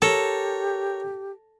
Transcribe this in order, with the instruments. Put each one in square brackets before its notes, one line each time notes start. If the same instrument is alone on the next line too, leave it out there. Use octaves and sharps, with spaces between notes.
[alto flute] G4 [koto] A4 [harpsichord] A#4 C#5